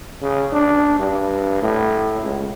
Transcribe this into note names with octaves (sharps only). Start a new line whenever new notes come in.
C#3
D4
G2
A2
C#2